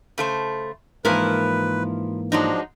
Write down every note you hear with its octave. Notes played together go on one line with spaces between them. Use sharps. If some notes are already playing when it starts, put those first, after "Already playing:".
C#3 A3 C5
G#2 E3 F3 A#3 E4 A#4 B4
F3 F#3 G#3 D4 D#4